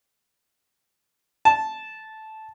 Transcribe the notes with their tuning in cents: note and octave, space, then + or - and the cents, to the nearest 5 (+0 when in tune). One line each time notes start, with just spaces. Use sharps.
A5 -10